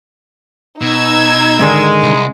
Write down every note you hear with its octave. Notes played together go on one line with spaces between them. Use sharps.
B2 D#4 E6 G#6
G#2 D3 D#3 G#3
C2